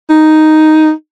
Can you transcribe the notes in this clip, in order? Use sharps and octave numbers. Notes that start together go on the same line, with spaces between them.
D#4